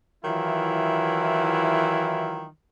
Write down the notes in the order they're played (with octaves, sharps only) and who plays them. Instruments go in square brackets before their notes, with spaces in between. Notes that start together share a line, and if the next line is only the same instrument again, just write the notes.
[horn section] D#3 E3 F#3 E4 F4